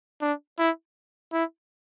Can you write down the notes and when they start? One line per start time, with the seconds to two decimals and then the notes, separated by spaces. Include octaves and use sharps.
0.21 D4
0.59 E4
1.33 E4